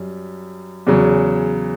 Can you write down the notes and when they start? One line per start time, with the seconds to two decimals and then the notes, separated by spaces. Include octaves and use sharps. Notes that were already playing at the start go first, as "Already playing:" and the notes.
Already playing: F#2 G3
0.87 E2 C#3 F#3